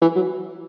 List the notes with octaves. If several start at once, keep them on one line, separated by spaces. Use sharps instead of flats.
E3
F#3